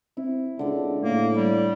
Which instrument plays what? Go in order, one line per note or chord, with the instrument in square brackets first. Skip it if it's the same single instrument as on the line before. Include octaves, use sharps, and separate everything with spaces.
[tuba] C4 [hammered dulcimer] E4
[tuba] C#2 [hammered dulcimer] D3 D5
[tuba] A2 [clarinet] A#3
[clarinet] G3 [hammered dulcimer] D5